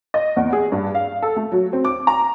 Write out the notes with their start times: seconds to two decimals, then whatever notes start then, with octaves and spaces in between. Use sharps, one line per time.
0.14 D#5
0.36 E2
0.53 G#4
0.72 G2
0.95 F5
1.22 A4
1.36 A3
1.52 F#3
1.73 C4
1.85 D6
2.07 A#5